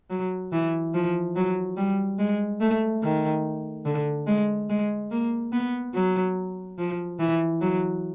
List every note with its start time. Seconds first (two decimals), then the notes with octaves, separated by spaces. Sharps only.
0.10 F#3
0.52 E3
0.94 F3
1.35 F#3
1.77 G3
2.19 G#3
2.61 A3
3.03 D#3
3.86 D3
4.27 G#3
4.70 G#3
5.11 A#3
5.52 B3
5.94 F#3
6.79 F3
7.19 E3
7.61 F#3